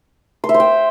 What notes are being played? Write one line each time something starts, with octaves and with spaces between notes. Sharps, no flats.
C6
E5
C5
G5